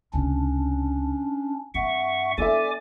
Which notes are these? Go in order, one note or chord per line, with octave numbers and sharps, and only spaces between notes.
C#2 C3 C#4 D4
G2 C4 E5 F#5 C#6
B3 D4 A4 D5 E5 G#5 D6